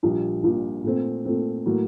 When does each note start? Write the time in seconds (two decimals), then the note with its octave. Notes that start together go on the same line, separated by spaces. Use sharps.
0.03 A#1 A#2 G3
0.43 A#1 A#2 G3
0.83 A#2 A3 C4
1.25 A#2 A3 C4
1.66 A2 F#3 A#3